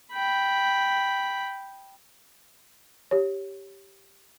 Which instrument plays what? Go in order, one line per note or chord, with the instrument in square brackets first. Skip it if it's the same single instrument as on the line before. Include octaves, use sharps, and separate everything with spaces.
[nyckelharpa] G5 B5
[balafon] G4 C#5